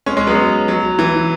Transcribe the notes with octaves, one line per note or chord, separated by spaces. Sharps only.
G#3 C#4
G#3 C#4
F#3 B3
F#3
E3